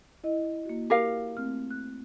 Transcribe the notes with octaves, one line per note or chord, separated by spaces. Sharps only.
E4 D#5
A#3 F#4
G4 A#4 F5
A3 C4 F6
F#6